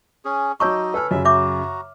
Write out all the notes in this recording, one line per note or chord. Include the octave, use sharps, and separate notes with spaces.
C#4 G#4
F#3 D#4 C#5 D#5 A5 C#6 D6 E6
A4 B4 G#5 F6
F#2 C#3 E5
F#4 C#5 E5 A#5 D6